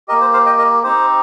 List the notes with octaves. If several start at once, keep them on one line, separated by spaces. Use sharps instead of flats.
A#3 G4 A#4 D#5
C5
C5 F5
D#5 G5
A#4 D#5
C4 D#4 G4 C5